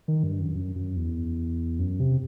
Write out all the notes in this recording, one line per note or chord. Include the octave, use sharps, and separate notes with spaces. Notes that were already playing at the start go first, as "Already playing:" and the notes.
D#3
G2
F#2
F#2
F#2
E2
F#2
C3